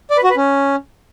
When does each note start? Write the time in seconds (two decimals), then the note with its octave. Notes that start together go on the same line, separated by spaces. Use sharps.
0.10 D5
0.17 B4
0.24 F#4
0.30 B4
0.37 C#4